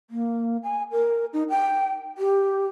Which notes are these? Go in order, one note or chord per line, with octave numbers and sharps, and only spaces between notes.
A#3
G#5
A#4
D#4
G5
G4